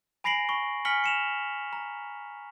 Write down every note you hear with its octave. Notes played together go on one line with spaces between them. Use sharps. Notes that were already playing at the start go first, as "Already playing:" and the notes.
G#5 B5 A#6 C7 D7 F#7
B5 C#6
G#5 F6 B6 C#7 F#7 G7
C#7 E7 F7
A#5